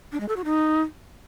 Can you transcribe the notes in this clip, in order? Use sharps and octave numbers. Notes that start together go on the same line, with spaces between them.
D4
G#3
A4
F#4
D#4